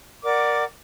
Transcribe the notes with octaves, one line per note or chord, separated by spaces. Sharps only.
A#4 D5 F#5 D6